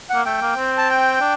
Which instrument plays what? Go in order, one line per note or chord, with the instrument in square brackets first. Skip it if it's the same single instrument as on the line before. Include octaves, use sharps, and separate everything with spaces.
[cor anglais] A#3 [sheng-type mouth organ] F#5
[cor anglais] A3 [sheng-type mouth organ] G5
[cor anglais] A#3
C4
[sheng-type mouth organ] A5
G5
[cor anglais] D4